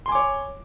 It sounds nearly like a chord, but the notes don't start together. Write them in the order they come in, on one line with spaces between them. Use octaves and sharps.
C6 G#5 D6 C#5